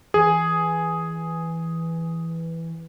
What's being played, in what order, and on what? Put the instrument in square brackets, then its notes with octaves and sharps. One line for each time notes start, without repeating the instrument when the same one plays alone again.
[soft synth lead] E3 [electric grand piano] G#4